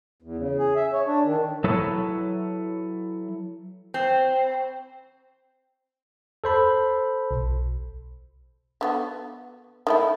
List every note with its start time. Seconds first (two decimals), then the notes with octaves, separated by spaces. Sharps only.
0.22 E2
0.37 C#3
0.59 G#4
0.76 E5
0.93 C#5
1.06 D4
1.24 D#3
1.64 F#3 E4 A4 B4 C#5
3.94 C4
6.44 A4 C5 B5
7.31 B1
8.81 D3 B3 F#4
9.87 D#3 A3 E4